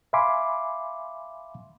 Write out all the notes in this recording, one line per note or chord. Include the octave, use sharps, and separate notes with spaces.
E5 F5 G#5 B5 C6 D6